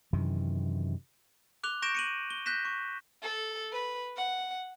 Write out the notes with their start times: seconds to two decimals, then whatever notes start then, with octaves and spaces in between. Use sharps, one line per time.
0.13 F#2 C3 D#3 E3
1.63 D6 F#6 F7 G7
1.82 C#6 G6 A#6 D7 E7
1.95 C#7 D#7 F#7
2.30 G7
2.46 F#6 G6 A#6 B6 E7
2.65 C#6
3.22 A4
3.72 B4
4.17 F#5